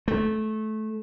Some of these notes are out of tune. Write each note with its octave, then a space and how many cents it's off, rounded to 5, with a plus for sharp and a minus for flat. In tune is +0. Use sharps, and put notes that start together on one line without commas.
A3 -20